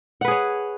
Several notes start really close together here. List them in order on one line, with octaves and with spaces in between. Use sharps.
F#5 B4 G#4 C#5